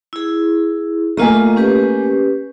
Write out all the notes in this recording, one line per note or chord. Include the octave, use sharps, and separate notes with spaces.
E4 G#4
A3 A#3 F4 D#5 G#5 A#5
C#4 G4 B4